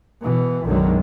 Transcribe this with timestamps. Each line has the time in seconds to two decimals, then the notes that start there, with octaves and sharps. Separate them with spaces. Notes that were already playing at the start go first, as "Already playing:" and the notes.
0.23 B2 E3
0.65 B1 F#2 D3 D#3 F#3 G#3